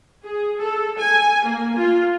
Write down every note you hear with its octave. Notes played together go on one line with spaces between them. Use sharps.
G#4
A4
G#5
A#3
F4